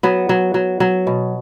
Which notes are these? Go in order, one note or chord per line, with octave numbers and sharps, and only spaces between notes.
F#3 B3
F#3
F#3
F#3
B2